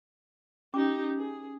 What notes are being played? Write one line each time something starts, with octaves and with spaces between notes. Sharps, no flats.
C#4 D#4 G4 D6
G#4